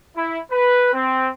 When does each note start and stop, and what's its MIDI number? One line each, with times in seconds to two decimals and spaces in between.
0.16 0.40 64
0.52 0.93 71
0.94 1.30 60